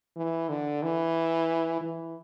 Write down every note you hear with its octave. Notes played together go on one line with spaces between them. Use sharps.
E3
D3
E3
E3